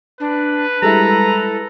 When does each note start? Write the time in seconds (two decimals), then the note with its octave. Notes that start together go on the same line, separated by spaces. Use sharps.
0.20 D4 B4
0.82 G3 G#3 E4 A4 A#5